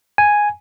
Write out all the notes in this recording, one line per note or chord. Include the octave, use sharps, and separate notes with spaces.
G#5